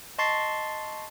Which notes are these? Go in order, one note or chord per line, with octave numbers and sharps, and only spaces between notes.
D#5 A5 C6 C#6 A6 C7